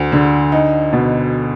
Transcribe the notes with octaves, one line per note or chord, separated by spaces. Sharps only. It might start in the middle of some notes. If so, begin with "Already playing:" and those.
Already playing: D2
D3
D#4
B2